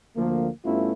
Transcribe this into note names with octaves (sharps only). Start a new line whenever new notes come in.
D2 D3 F3 A#3
G2 A3 B3 C#4 E4 F4